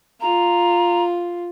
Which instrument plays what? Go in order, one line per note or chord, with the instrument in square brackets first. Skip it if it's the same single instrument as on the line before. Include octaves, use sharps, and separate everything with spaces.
[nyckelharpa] F4 [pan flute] A#5